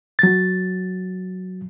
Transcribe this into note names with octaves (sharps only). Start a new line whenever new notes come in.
F#3 A6